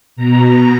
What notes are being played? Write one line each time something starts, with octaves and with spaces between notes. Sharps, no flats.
B2 A#5